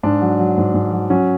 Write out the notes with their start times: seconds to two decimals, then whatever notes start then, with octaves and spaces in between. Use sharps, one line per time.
0.03 G#2 D4
0.21 F#3
0.39 F#3
0.58 G#2
0.74 G#2
0.93 F#3
1.10 F#3 C#4